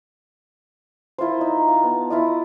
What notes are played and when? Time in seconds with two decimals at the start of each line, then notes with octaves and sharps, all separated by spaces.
1.18 E4 F4 A#4 C5
1.41 D#4
1.68 F5
1.83 B3 A5
2.10 E4 F4 D#5